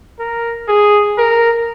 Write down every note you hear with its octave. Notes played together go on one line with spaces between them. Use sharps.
A#4
G#4
A#4